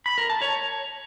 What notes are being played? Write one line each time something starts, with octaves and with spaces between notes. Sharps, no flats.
B5
A#4
A5
C#5